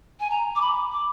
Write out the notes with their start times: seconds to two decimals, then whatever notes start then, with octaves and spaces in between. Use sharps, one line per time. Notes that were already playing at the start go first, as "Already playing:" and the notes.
0.20 G#5
0.30 A#5
0.55 D6
0.61 B5
0.92 D6